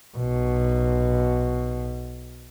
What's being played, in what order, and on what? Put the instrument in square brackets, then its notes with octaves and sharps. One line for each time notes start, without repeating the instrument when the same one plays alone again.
[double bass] B1 B2